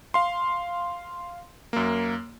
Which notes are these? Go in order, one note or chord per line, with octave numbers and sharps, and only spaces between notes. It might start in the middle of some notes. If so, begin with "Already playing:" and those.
F5 C6
F#2 A#3